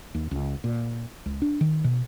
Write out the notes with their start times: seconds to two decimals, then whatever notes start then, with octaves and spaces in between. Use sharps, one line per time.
0.14 D#2
0.31 C#2
0.64 A#2
1.26 C#2
1.42 D4
1.61 D#3
1.84 B2